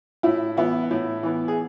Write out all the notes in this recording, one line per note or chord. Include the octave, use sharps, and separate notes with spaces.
A2 E4
E3 B3 E4
A2
E3 B3
G#4